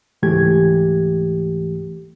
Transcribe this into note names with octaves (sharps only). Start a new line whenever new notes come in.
C#2 G#2 E3 A3 G4 G#6